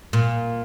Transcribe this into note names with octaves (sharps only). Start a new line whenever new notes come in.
A#2